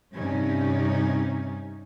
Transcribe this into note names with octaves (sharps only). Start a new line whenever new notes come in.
G2 C3 C#4 D#4